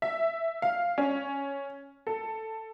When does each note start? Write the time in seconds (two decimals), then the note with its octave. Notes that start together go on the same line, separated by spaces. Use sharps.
0.02 E5
0.62 F5
0.98 C#4
2.07 A4